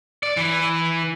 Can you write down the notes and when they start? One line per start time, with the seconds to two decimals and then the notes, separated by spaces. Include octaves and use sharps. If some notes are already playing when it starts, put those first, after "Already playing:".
0.23 D5
0.37 E3